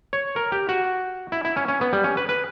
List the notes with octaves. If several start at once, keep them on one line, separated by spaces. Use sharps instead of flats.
C#5
A#4
G4
F#4
E4
E4
C#4
C#4
B3
G3
C#4
B4
B4